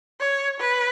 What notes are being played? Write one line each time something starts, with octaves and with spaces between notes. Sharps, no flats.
C#5
B4